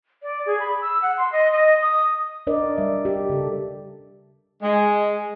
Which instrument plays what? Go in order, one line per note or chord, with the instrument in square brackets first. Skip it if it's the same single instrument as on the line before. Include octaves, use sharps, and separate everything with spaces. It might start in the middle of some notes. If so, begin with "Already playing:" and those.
[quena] D5
G#4
B5
E6
F#5
C6
D#5
D#5
D#6
[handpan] D4 A#4 D5 D#5
G3 E5
G4
C#3 A4
[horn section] G#3